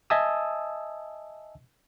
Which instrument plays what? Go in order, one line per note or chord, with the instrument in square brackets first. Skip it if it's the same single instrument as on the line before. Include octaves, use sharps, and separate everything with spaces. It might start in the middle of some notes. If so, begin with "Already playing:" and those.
[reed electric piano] D#5 E5 G#5 A5 D#6 E6